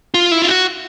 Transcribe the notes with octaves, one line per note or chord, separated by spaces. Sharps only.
F4
E4
F4
F#4